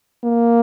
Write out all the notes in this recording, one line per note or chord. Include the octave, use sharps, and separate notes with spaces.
A#3